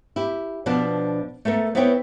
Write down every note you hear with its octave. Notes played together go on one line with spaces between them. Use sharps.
E4 G4
B2 F3 B3 D4 A5
A3 B3 A4 A#4
B3 C4 E4 B4 C#5 G5